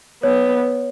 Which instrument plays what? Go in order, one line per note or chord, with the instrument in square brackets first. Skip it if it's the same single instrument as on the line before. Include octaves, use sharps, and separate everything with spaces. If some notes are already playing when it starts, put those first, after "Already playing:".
[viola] B3 [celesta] C#5